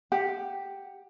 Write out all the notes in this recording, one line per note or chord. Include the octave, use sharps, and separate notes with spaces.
G4 F#5